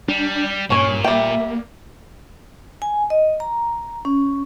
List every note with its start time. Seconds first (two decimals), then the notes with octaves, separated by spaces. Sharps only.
0.08 G3 D4
0.70 G2 A#2 C#4 C#5
1.04 G3 A#3 E5 G5
2.82 G#5
3.10 D#5
3.40 A#5
4.05 C#4